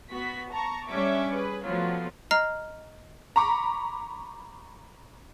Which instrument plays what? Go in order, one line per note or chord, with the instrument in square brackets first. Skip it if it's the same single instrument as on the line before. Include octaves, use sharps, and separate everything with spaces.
[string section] B3 F#4 B6
A5 A#5 C#6
G3 C#4 D4 E5 C#6 D6
G#4 B4
F3 F#3 A3 B3 F4 F#4
[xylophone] D#5 A#5 F6 C7
[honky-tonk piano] A#5 B5 C#6 D6